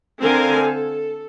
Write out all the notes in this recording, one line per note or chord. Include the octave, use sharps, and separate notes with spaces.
D3 C4 A#4 F5 G#5
A4